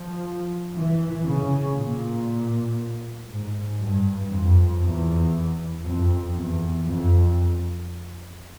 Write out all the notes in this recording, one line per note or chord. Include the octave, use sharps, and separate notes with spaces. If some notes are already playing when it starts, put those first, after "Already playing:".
Already playing: F3
E3
C#3
A#2
G#2
G2
F2
E2
F2
E2
F2